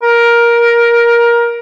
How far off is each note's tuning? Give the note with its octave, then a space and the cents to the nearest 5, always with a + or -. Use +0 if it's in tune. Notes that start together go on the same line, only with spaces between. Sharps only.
A#4 +15